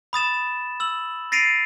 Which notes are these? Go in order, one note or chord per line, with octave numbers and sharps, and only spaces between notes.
B5 D#6 A6 E7
E6 F#7
A6 A#6 C7 D7 D#7 F7